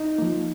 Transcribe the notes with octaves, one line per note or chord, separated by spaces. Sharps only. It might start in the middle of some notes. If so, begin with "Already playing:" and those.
Already playing: D#4
F3 A#3